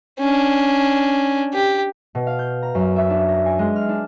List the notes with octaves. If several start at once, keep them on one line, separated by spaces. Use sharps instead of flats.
C#4 D4
G4
B2
F5
G6
A#5
F#2
E5
D4
A#6
G#5
G#3
F6
D4